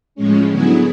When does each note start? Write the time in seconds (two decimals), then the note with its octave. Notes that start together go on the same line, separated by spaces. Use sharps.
0.15 A2 F3 G#3 C#4
0.49 D3 F#3 B3 E4 G#4